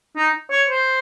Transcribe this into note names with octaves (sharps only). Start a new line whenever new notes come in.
D#4
C#5
C5